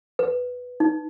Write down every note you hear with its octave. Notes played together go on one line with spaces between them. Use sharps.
B4
D#4